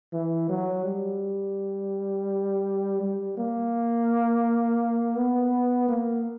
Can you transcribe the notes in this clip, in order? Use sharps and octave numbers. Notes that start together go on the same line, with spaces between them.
E3
F#3
G3
G3
A#3
B3
A#3